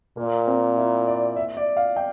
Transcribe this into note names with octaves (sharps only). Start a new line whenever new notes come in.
A#2 A#3
C4
E4
D5
E5
D5
F5
G5